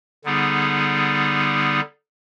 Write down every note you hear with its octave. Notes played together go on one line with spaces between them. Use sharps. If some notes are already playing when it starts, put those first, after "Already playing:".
D3 G3 B3 D#4 G#4